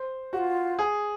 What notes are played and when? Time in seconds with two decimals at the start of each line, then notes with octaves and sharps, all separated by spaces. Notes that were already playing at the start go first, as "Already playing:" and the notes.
Already playing: C5
0.33 F#4 G4
0.38 F4
0.79 G#4